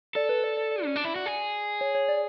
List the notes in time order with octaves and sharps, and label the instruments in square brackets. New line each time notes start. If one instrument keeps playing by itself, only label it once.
[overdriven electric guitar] A4 [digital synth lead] D5
[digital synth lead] B4
D5
D5
D5
[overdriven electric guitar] C#4
D4
E4
F#4
G#4
[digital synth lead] C#5
C#5
D5